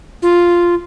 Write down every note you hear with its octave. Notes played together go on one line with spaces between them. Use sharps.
F4